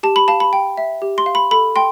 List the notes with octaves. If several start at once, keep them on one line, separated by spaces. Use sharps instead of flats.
G4 A5
B5
F5 A5
B5
G5
E5
G4
C6
F5
B5
A4 B5
G5 C6